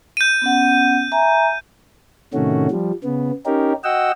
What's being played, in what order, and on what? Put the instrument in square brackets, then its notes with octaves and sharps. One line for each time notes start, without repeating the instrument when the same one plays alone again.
[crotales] G6 D#7
[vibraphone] B3 C#4 F#5
E5 G#5 A#5
[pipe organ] A2 C3 D#3 A3 C#4 F#4
F3 G3
C#3 B3
C#4 D#4 G4 A#4
F#4 D#5 F#5 G5 E6